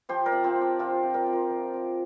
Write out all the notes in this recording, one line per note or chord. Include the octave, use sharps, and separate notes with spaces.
F3 G4 C5
A#4 D5
C3
C4 F4
C3
D4
C3 C4 F4
C3
A#4 D5
C3
F4 A#4
F3
C3